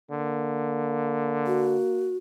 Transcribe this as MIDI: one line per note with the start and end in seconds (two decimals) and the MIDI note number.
0.11 1.79 50
0.11 2.17 58
1.47 2.17 66